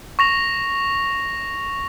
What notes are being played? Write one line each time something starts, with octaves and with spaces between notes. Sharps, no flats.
C#6 A#6 F7